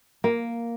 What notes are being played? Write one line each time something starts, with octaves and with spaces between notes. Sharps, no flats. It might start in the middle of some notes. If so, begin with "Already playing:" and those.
A#3